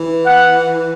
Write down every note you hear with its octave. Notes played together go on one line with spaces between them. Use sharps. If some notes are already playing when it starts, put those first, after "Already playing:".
Already playing: E3
F#5